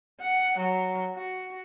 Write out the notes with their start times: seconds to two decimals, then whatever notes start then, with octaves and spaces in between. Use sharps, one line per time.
0.21 F#5
0.58 F#3
1.15 F#4